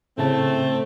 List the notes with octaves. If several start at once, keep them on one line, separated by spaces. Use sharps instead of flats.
A2 C#3 A3 C4 A5